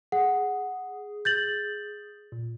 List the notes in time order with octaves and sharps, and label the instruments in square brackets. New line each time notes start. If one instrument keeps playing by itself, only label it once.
[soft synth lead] G#4 [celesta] F#5
[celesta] G6 A6 F#7
[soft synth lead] A#2